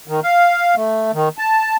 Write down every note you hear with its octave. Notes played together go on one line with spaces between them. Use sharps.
D#3
F5
A3
D#3
A5